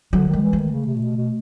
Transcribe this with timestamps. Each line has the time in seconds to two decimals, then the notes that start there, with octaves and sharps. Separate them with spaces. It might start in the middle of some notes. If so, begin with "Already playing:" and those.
0.13 D3 F#3
0.29 D#3 G#3
0.42 E3
0.53 A3
0.58 D#3
0.72 C#3
0.87 C3
0.96 A#2
1.02 B2
1.17 B2